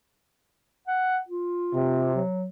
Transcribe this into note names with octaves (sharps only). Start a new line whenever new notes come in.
F#5
F4
C3
F#3